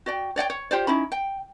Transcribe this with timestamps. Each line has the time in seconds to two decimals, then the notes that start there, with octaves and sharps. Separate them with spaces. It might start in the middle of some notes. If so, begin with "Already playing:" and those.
0.06 F#4 D5 G5
0.36 C#5 D5 F#5 G5
0.50 C#5
0.71 F4 G4 C5 D5
0.87 C#4 D#4 E4 B5
1.12 G5